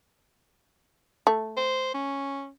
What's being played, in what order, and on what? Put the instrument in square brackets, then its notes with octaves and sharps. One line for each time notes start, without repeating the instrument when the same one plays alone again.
[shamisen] A3
[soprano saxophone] C5
C#4